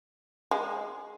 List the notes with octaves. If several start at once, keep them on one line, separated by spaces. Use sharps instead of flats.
G#3